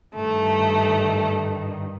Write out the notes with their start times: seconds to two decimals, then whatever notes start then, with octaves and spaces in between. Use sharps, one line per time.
0.15 G2 D#3 A3